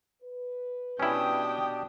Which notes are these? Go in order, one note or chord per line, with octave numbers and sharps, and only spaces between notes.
B4
B2 C#4 D4 E4 G4 G5 D#6